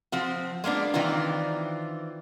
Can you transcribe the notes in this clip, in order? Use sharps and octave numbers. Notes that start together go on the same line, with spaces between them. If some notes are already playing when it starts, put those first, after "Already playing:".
F3 C4 F#4
G#3 A#3 B3 D4
D#3 E3 C4 D4 F4